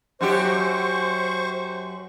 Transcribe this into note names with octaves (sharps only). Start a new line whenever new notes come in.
F#2 F#4 G4 C5 C#6